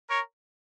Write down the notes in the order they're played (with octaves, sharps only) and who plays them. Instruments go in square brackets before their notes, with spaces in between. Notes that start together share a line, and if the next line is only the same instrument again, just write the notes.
[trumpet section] A#4 C#5